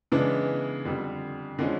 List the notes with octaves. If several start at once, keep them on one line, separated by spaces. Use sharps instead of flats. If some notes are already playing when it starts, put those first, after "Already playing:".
C#3 E3 G#3 B3 D4
F2 D3 G3
D3 F3 G#3 C#4